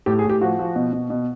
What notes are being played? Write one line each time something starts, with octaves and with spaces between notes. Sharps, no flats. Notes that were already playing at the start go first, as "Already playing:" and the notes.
A2 G4
G#4
A2
G4
F3 F#4
F3
B2
B2
B2